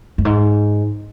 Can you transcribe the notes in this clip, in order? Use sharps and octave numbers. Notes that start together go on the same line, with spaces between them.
G2
G#2